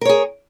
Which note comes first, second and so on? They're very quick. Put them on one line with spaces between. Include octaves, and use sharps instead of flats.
A#4 C#5 G#4